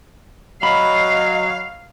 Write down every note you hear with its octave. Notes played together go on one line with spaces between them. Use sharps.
F#3 D#5 F5 B5